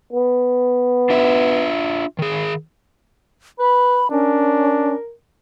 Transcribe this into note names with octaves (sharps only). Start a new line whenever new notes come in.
B3
D4 F4 E5
D#3 G#4
B4 B5
C#4 D4 A#4